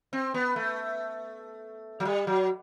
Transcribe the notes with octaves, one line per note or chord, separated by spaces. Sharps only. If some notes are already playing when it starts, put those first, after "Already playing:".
C4
B3
A3
F#3
G3
F#3